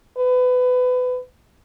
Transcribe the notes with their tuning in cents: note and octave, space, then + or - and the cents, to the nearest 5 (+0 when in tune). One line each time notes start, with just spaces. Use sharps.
B4 +25